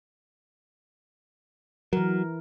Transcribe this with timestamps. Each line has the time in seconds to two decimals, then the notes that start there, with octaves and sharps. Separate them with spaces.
1.93 E3 F#3 A#4